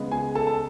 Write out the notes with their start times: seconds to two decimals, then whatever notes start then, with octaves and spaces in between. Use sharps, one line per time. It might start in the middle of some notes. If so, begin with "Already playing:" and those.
Already playing: C#3 G#3 B3
0.11 G#4 G#5
0.35 A4 A5
0.47 A5